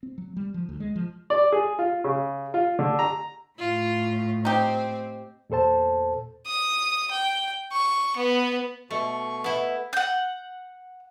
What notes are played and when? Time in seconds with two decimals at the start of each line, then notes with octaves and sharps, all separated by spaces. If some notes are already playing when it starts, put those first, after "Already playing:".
0.03 C4
0.18 F#3
0.37 G3
0.54 F3
0.69 D2
0.80 G#3
0.96 F3
1.30 D5
1.52 G#4
1.79 F4
2.04 C#3
2.54 F4
2.79 D3
2.99 A#5
3.59 A2 F4
4.45 C4 D#4 G4
5.50 E2 A#2 A4 C5 A5
6.46 D#6
7.11 G5
7.72 C#6
8.16 B3
8.91 B2 A3 C#6
9.44 B3 E4
9.93 F#5 G6